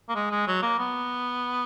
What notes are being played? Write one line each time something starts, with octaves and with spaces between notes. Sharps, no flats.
A#3
G#3
G#3
F#3
A#3
B3